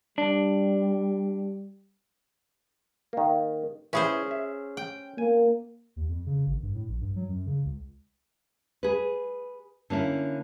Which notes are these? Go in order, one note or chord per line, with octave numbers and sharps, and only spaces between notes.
G3 D4
D#3 A#3
C#4 E4 G#4 B4 C5
E5
G5
A#3 G#5
D#2
F2
C#3
G#1
G2
A2
A#1
G2
F#3
F#2
C#3
C#2
G#4 B4
D3 A#3 C#4 E4